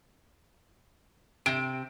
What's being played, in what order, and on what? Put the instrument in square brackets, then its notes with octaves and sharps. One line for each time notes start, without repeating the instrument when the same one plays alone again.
[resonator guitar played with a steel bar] C3 [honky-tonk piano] D7